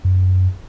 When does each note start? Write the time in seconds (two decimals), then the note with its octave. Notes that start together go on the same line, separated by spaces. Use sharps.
0.05 F#2